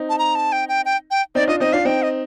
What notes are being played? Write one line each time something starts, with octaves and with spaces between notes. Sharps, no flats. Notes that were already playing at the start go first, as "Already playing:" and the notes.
Already playing: C4 D#4
A5
A#5
A5
G5
G5
G5
G5
C4 D#4 D5
D4 F4 D#5
C4 D#4 D#5
D4 F4 F5
C4 D#4 G5
D#5